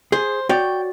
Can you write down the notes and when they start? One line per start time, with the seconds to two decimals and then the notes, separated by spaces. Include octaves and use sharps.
0.12 G#4 C5
0.49 F#4 C#5 D5 G5